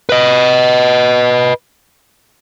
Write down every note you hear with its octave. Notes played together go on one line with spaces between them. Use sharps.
B4 D#5